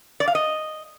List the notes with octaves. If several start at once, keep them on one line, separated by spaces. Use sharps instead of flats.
D5
F5
D#5